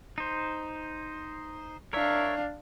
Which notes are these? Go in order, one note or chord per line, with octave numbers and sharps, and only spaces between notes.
D#4 C5
D4 A#4 C#5 E5 F5